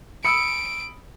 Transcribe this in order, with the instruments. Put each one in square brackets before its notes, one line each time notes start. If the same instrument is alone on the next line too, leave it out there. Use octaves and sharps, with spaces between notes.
[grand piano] B5 D#6 E6 [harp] C#7 [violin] D7